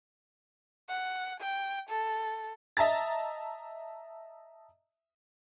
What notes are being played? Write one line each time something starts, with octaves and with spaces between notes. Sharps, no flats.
F#5
G5
A4
D#5 E5 A5 A#5 A6